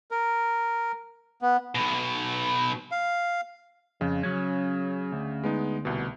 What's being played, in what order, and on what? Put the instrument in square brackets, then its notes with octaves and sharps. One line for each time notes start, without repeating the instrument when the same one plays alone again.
[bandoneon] A#4
B3
[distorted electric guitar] B1 B2
[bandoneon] F5
[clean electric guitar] F2 [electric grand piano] C#3
[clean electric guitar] F#3 C#4
D2
[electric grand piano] G#3 B3 D#4
C2 B2